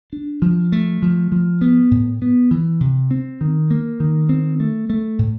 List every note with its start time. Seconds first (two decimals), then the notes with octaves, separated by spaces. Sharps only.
0.13 D4
0.42 F3
0.72 A3
1.02 F3
1.32 F3
1.61 B3
1.91 A2
2.22 B3
2.51 E3
2.80 C3
3.11 C4
3.41 D#3
3.71 A#3
4.00 D#3
4.29 C4
4.60 A3
4.90 A3
5.19 A2